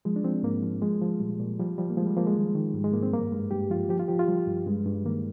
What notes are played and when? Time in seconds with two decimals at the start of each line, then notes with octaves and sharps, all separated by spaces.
0.05 F3 G#3
0.16 D4
0.24 F3 C4
0.43 G#2 A#3
0.63 F3
0.81 F3 G#3
1.01 F3
1.20 A#2 G3
1.39 A#2
1.60 F3 G3
1.78 F3 G3
1.90 A#3
1.97 F3 G#3
2.06 G3
2.16 F3 A#3
2.26 G#3
2.36 D#3
2.55 D#3
2.74 G#2 G3
2.84 G#3
2.93 G#2 A#3
3.03 C4
3.13 G2 A#3
3.32 G2 G#3
3.51 G2 G4
3.70 F3 F4
3.89 F3 G4
3.99 F4
4.08 F3 G4
4.19 F4
4.28 F3 G3
4.47 G2
4.67 G2 G#3
4.86 G2
5.05 D#3 A#3